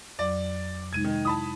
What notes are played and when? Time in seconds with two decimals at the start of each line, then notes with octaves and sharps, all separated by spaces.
0.19 F2 F#3 D5
0.93 C3 G#3 D#4 G#6 D#7
1.05 D#3
1.25 E4 A5 B5 D#6